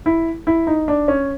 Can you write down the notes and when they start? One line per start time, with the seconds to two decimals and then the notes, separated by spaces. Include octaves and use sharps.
0.06 E4
0.47 E4
0.67 D#4
0.88 D4
1.08 C#4